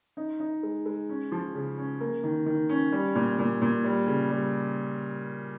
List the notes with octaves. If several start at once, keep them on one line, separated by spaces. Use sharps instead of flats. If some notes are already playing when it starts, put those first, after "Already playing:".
D#4
D#4
G#3
G#3
C#4
F3
C#3
C#4
A#3
D#3
D#3
C#4
G3
A#2
A#2
A#2
G3
C#3
G3